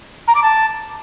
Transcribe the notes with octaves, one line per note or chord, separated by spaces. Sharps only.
A#5
D6
A5